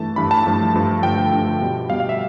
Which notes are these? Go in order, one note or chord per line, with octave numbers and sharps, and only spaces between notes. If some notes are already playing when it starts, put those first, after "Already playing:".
Already playing: G2 E3 A3 A5
G2 E3 A3 B5
A5
G2 F3 A3
G2 F3 A3
G2 D3 F3 A3 G5
G2 D3 F3 A3
B2 G3
B2 G3 F5
F5
E5